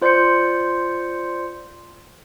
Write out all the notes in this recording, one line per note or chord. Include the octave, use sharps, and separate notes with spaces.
F4 C5 D5 C6 G6 C#7